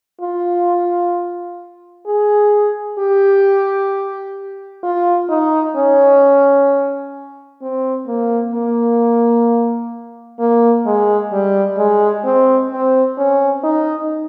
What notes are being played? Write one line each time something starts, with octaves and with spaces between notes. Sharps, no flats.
F4
G#4
G4
F4
D#4
C#4
C4
A#3
A#3
A#3
G#3
G3
G#3
C4
C4
C#4
D#4